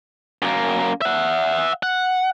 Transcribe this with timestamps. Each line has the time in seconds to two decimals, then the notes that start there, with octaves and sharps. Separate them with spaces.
0.42 F#2 A#3
1.02 E5 F#5
1.83 F#5